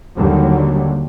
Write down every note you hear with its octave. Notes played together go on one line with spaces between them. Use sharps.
D#2 D3 F#3 G3